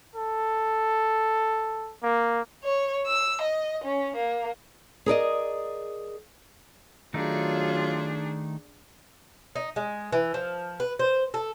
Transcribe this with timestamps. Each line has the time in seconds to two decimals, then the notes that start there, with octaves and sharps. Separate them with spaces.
0.16 A4
2.03 A#3
2.63 C#5
3.06 E6
3.42 D#5
3.84 C#4
4.16 A#3
5.06 G#4 A#4 D5 D#5
7.14 D#3 F#3 A3 D4 D#4 F4 G#4
9.55 D#4
9.76 G#3
10.13 E3
10.34 F3
10.80 B4
10.99 C5
11.34 A4